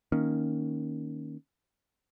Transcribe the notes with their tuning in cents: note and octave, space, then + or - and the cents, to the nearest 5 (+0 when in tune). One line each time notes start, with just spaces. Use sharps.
D#3 +0 A#3 +0 C#4 +0